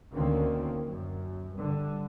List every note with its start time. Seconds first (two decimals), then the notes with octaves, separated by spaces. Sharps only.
0.14 D2 D3 D#3 A#3 C4 C#4
0.87 F#2
1.58 G2 D3